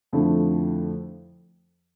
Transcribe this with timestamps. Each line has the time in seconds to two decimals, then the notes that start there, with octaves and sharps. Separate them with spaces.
0.13 F2 D3 F3 A3 E4